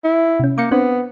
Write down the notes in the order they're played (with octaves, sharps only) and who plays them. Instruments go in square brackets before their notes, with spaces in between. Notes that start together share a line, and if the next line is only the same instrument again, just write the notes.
[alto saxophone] E4
[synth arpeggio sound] C3 C#4
[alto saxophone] A#3 [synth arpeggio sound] D6 G6 C#7
[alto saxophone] B3 [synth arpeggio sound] C4 D4 C5